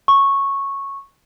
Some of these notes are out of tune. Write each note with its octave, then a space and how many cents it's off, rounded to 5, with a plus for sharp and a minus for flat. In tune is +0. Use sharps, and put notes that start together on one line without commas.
C#6 -10